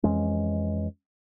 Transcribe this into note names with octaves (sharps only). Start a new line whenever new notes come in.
F2 E3 G#3 C#4